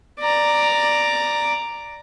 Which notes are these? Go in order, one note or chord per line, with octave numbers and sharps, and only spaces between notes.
D5 A#5